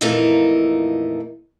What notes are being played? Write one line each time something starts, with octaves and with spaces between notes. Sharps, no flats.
F2 A#2 E3 A3 D#4 A#4